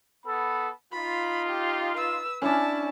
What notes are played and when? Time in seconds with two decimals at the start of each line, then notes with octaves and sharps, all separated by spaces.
0.25 B3 A4 B5
0.92 D#4 F4 B5
1.49 G4
1.96 B4 E6
2.42 C#4 D4 E4 A5